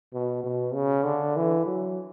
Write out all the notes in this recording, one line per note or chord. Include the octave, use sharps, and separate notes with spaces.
B2
B2
C#3
D3
E3
F#3